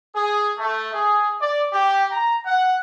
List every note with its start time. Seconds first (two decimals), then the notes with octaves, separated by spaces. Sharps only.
0.15 G#4
0.58 A3
0.93 G#4
1.41 D5
1.73 G4
2.11 A#5
2.45 F#5